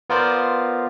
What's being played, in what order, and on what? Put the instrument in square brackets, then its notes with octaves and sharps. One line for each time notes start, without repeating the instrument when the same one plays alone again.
[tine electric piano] B3 F4 A#4 C5 D5